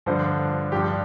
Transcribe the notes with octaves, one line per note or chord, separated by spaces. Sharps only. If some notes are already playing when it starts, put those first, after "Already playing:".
G2 D3 F3 C5
G2 F3 G4
D4